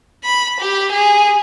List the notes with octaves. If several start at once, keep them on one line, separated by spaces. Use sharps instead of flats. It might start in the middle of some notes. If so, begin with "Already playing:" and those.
B5
G4
G#4